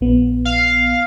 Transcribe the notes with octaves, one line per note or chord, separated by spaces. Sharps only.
A#1 B3
F5